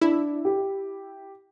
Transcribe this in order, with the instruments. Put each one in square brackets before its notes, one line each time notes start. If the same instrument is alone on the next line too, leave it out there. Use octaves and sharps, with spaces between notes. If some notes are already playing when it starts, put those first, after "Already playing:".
[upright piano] D4 [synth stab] E4
[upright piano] G4